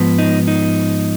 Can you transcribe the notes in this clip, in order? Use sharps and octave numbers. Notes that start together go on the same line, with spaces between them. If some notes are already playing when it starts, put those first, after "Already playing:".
Already playing: G#2 F3 B3
D#4
D#4